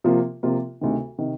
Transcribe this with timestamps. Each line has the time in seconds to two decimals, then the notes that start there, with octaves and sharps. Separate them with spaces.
0.04 C3 F3 A#3 F4
0.43 C3 F3 A#3 F4
0.81 D2 C3 D#3
1.18 C3 D#3